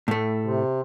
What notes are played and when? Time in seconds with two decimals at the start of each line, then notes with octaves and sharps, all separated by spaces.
0.08 A2 A3
0.44 C3